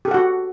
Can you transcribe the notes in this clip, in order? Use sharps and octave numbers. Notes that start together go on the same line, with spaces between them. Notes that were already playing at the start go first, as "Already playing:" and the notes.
F#4 G4 A4 F#5